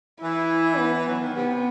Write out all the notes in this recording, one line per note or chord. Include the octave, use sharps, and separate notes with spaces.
E3 E4
B3
F#3
D#3
C3 B3
C3